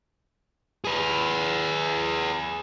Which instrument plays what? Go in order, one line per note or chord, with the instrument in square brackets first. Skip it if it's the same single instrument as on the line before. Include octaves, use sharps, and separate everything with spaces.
[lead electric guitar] G#4 B4